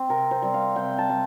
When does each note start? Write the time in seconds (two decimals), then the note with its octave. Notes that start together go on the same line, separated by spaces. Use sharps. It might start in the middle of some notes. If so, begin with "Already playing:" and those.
Already playing: C4
0.09 C3 A#4
0.31 C5
0.42 G3 C4
0.54 F5
0.76 C3 G5
0.98 A5
1.09 G3